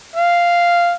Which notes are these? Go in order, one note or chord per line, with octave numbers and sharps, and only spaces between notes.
F5